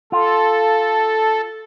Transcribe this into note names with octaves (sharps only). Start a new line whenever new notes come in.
F4 A4